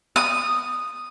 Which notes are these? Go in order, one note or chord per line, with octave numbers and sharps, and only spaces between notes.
D#6